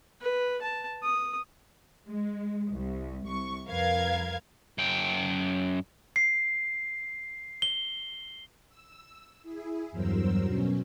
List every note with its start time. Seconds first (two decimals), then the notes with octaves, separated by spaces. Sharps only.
0.21 B4
0.62 A5
1.03 D#6
2.07 G#3
2.72 C2
3.26 C2 C#6
3.67 F2 A#4 B4 F5 G#6
4.78 F#2 G5
6.16 C7
7.62 G7
8.68 E6
9.43 E4 G#4
9.91 E2 G2 F#3 A#4 C5 E6
10.44 B2 F#3 C#4